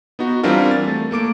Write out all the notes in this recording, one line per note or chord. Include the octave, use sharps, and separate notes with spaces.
B3 D#4 F#4
E3 G3 C4 D4 F4 A#4
A6
A3
A3 A#3 D6 D7